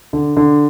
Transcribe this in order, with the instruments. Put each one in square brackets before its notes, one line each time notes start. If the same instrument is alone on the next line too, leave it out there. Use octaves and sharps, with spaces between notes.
[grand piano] D3
D3